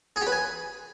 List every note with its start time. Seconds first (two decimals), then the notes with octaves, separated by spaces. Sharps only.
0.16 G#4
0.21 G4
0.27 B4
0.32 G#5